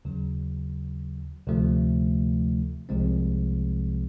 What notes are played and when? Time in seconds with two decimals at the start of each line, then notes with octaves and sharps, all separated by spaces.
0.05 D#2 C#3 F#3
1.47 D2 C3 F3 A3
2.89 C2 C3 F3 G#3 C4